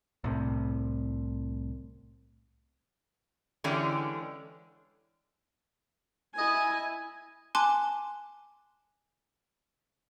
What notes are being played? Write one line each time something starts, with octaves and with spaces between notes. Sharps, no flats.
C2 A2 C3
D3 E3 G#3 C#4 D4 G4
E4 D#5 G#5
G#5 A5 C6 D6 F#6